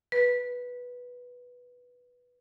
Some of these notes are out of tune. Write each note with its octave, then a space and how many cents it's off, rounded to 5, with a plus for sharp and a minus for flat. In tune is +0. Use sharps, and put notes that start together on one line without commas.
B4 -5